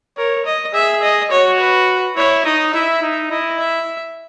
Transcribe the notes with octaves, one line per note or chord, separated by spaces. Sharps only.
A#4 C#5
D#5
G#4 E5
D#5
F#4 C#5
B4
E4 C#5
D#4 D#5
E4 E5
D#4
E4 D#5
E5